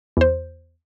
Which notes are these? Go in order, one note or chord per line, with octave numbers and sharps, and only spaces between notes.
E2 C5